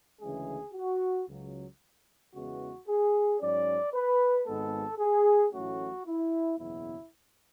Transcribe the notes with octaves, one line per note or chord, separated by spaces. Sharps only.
D2 C#3 E3 G#3 C#4 G#4
F#4
C#2 C#3 F#3
E2 C#3 E3 G#3 B3 F#4
G#4
G#2 F#3 C#4 D5
B4
G#1 G#2 G#3 B3 A4
G#4
A1 A2 F#3 A3 C#4 F#4
E4
F#1 E2 B2 F#3 B3 E4